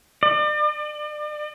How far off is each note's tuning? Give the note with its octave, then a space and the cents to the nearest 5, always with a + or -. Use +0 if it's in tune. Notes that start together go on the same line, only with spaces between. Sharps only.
D5 +40